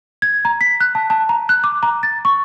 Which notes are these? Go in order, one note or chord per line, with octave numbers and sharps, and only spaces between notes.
G#6
A#5
B6
F#6
A5
A5
A#5
F#6
D6
A#5
A6
C#6